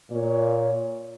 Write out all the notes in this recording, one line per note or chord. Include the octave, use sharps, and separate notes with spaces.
A#2 C#5